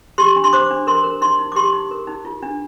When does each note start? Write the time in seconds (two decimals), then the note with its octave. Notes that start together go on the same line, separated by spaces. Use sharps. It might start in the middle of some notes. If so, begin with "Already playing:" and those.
0.18 G4 C6
0.36 D4
0.44 C6
0.53 C5 D6
0.70 D4
0.87 A#4 C6
1.04 A#4
1.21 D#4 C6
1.39 D#4
1.52 D6
1.56 G4 C6
1.73 D#4
1.91 A#4
2.07 D#4
2.25 F4
2.43 D4